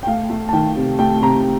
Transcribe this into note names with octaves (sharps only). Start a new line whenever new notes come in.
G5
A3 F5
A3
A5
D#3 G5
C3
A3 G5
C3 A#5